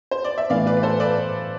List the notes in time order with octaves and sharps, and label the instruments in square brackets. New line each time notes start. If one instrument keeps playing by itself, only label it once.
[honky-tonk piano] C5
D5
E5
[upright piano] A2 E3 B3 [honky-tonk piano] D5 F5
[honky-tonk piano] B4 D5
B4
A4 C5
B4 D5